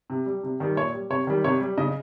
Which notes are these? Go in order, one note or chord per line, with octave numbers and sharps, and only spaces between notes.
C3
G3
C3
D#3 G3
A#2 C#5
G3
C3 C#5
D#3 G3
C3 C#5
G3
C#3 D#5